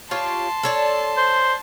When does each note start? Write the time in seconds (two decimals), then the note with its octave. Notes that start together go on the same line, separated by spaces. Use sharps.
0.11 F4 G4 C#5 A5 C6
0.63 A4 C#5 D5
1.17 C5